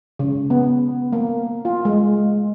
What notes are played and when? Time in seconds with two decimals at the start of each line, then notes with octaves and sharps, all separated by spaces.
0.19 C#3
0.50 B3
1.13 A#3
1.65 F4
1.85 G#3